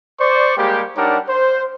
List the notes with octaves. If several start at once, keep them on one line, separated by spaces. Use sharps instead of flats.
C5 D5 C#6
G3 G#3 A#3 G4
G3 D4 D#4 A#4 C#5 F#5
C5